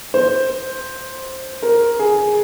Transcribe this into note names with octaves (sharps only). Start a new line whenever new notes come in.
C5
A#4
G#4